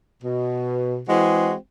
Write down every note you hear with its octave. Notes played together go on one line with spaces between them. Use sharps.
B2
E3 G#3 C4 F#4 G#4